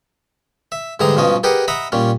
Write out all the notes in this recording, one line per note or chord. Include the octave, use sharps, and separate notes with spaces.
E5
G#2 D3 E3 G3 G#4 A#5
G2 B2 F3 C#4 D#5
G4 G#4 A#4 B4 D#5 F#5
D#5 E5 F#5 A#5 B5
A#2 G3 C#4